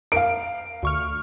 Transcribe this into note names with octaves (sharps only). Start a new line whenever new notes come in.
A#4 F5 D7
D2 C#6 F6